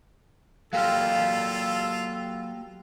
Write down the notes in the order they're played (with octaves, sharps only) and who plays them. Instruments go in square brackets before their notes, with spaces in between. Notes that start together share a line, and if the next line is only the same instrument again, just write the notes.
[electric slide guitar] F#3 A#3 G4 [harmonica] F4 A4 [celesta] F5 F6 [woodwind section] E6